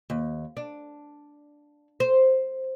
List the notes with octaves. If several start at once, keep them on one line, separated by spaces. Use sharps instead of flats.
D#2
D4
C5